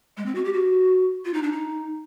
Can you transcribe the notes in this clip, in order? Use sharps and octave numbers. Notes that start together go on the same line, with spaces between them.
G#3
C4
F#4
G4
F#4
F4
D#4
D4
D#4